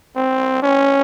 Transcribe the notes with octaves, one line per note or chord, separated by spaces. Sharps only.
C4
C#4